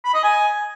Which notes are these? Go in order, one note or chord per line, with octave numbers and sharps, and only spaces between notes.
B5
D#5
G#5